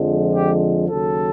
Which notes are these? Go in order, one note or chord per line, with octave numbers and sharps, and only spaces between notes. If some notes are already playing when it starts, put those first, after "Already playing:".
Already playing: F2 D3 F3 G#3
G4
D#2 C#3 F#3 A4